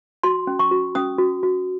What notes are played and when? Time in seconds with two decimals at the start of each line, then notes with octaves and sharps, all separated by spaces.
0.23 F#4 C6
0.47 C#4
0.59 C#6
0.71 F#4
0.95 C#4 D#6
1.18 F#4
1.43 F#4